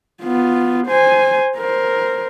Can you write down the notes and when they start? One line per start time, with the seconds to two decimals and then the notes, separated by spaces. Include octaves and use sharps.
0.23 B3 F4
0.87 C5 G#5
1.57 A#4 C5